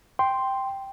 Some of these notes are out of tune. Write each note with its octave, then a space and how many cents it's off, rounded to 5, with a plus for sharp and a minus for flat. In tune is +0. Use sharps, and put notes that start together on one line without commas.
G5 +0 C6 +0